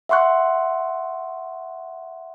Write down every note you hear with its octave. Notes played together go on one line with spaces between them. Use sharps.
E5 F#5 C6 C#6 F#6